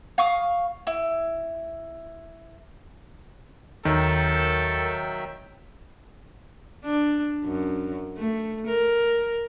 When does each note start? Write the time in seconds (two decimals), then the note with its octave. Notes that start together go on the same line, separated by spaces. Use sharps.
0.18 F5 C#6 D#6
0.87 E4
3.85 D#2 D#3 F#3 A4 A#4 E5 G5 G6
6.85 D4
7.45 F#2
8.18 A3
8.68 A#4